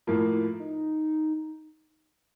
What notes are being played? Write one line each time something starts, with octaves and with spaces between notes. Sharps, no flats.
A2 F3 A#3 E4
E4
D#4